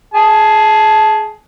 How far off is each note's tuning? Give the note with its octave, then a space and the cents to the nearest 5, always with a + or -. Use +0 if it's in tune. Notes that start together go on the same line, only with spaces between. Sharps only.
G#4 +10 A5 -15